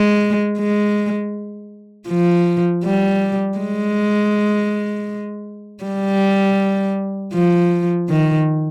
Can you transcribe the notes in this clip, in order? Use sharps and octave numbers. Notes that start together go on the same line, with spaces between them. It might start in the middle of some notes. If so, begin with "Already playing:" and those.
Already playing: G#3
G#3
F3
G3
G#3
G3
F3
D#3